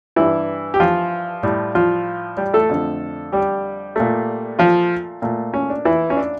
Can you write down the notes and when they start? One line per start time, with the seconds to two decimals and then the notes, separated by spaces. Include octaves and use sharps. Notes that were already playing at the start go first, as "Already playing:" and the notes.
0.16 G2 E3 G3 E4
0.74 G4
0.80 F3 F4
1.43 A2 G3
1.75 F3 F4
2.37 G3 G4
2.53 A3 A4
2.69 F2 D3 A3
3.32 G3 G4
3.96 A#2 A3
4.59 F3 F4
5.22 A#2 A3
5.54 C#4
5.70 D4
5.85 E3 E4
6.10 C#4
6.17 D4